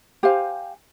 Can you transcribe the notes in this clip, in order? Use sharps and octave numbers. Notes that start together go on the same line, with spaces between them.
G4 C5 F5 G#5